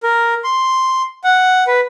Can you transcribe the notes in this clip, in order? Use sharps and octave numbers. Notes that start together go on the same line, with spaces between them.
A#4
C6
F#5
B4